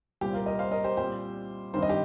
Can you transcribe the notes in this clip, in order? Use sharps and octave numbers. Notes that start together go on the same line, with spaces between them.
C2 A#2 G3 C4 G4
F4 A#4
A#4 D#5
C5 F5
A#4 D#5
G4 C5
A#2 G3 C4 G4 C5
G2 D#3 C4 C5
D#5
G4